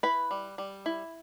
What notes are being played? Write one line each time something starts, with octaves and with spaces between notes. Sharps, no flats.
E4 B4 B5
G3
G3
E4